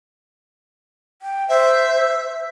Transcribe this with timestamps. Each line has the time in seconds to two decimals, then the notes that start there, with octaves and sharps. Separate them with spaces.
1.22 G5
1.49 C5 E5